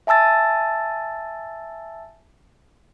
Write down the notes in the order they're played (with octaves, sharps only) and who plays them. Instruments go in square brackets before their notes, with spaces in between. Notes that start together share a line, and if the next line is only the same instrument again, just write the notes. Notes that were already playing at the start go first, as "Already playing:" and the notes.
[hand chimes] E5 G#5 A5 E6 A6